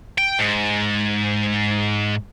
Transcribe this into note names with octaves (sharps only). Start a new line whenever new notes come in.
G5
G#2